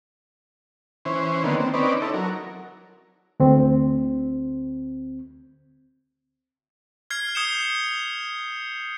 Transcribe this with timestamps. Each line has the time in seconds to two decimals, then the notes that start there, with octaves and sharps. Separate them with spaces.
1.05 E3 C#4 C5
1.44 D3 D#3 A#3 B3
1.60 C4
1.74 C4 C#4 D#4 B4 D5
2.02 D#4 E4 A4
2.14 F#3 A#4
3.40 D2 C4
7.10 F6 G#6 C7
7.35 D#6 G6 C#7 E7